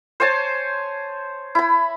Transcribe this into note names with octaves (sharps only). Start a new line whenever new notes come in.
C5 C#5 G#5 A5
E4 B5